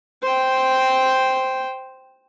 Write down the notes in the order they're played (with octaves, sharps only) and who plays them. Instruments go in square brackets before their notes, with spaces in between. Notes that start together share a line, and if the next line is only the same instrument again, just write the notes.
[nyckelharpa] C5 G5